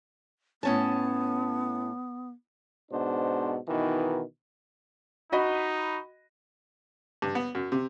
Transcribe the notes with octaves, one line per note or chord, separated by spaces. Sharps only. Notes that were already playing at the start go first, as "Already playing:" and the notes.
A2 B3 C#4 A5
G#2 B2 D4 C5
B2 D#3 E3 D#4
D#4 F#4 D#5 B5
G2
B3
F#2
C3